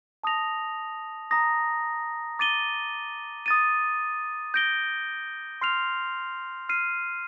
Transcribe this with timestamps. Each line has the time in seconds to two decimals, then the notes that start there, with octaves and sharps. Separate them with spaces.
0.24 A5 D#6 A#6 F7
1.31 A#5 D#6 A#6
2.39 D6 A6 D#7 G7
3.46 D#6 A6 D#7
4.54 G6 A#6 D7 G7
5.61 C6 F6 C7 F7
6.69 F6 C7 D#7